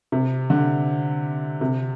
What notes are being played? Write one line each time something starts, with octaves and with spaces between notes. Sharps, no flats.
C3
D3
C3